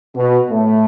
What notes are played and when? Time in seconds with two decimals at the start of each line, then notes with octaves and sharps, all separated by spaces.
0.16 B2 B3
0.49 A2 A3